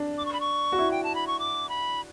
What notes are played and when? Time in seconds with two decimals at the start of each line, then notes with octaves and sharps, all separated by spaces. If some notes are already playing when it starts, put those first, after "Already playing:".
Already playing: D4
0.18 D6
0.25 C#6
0.33 B5
0.40 C#6
0.72 F#4
0.79 E4
0.91 G5
1.04 A5
1.15 B5
1.27 C#6
1.39 D6
1.69 B5